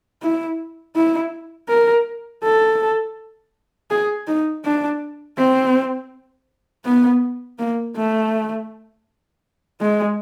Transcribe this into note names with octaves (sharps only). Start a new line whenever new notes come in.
E4
E4
A#4
A4
G#4
D#4
D4
C4
B3
A#3
A3
G#3